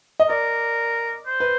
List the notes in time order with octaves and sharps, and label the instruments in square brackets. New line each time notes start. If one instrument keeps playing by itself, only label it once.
[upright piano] D#5
[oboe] A#4 [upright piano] D5
[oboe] C5
[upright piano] B4